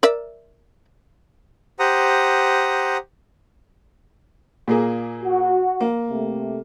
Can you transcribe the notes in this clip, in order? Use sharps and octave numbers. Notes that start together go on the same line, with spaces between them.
A#4 D5 E5
G4 C5 F#5 A#5 D#6
A#2 A#3 G#4
F#4
A#3
C3 A3